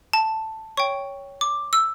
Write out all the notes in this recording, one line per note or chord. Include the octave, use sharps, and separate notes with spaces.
A5
C#5 G5 C#6
D6
E6